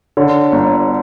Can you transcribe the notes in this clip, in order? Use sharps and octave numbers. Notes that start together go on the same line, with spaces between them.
D3 C#5
G1